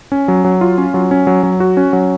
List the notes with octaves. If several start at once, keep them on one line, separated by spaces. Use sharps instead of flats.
C#4
F#3
F#3
F4
C#4
F#3
C#4
F#3
F#3
F#4
C#4
F#3